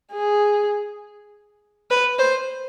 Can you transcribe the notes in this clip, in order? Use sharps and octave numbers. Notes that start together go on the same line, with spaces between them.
G#4
B4
C5